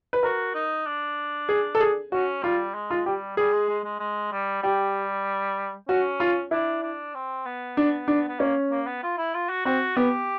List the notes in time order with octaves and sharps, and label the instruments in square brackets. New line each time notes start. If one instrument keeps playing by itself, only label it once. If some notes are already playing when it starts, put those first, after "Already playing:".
[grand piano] B4
[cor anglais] F#4 [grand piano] A#4
[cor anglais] D#4
D4
[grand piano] G#4
A4
G#4
[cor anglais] C#4 [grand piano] F#4
[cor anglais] G3 [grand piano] F4
[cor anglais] G#3
[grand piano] F4
[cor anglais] G3 [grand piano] G4
[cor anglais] G3 [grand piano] G#4
[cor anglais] G#3
G#3
G#3
G#3
G3
[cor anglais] G3 [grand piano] G4
[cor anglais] C#4 [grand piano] F#4
[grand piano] F4
[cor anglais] D4 [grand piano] E4
[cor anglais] D4
C4
B3
[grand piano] D4
D4
[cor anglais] B3
[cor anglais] A#3 [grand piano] C#4
[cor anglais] A#3
B3
F4
E4
F4
F#4
[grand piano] C4 [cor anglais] F#4
[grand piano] B3 [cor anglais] G4